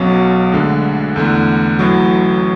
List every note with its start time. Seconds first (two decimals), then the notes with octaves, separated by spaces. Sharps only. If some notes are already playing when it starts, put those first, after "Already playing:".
Already playing: B1 B2 F#3 C#4
0.52 D2 D3 G#3
1.16 E2 D3 A3
1.79 A1 A2 F#3